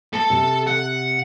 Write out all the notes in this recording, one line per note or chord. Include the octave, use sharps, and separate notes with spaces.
A4 A5
C3
F#5